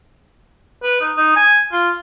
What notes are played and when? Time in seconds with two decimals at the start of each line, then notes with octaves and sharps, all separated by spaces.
0.83 B4
1.01 D#4
1.17 D#4
1.36 G#5
1.72 F4